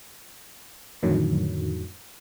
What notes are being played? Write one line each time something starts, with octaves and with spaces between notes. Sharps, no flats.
F2 A2 D3 D#3 F#3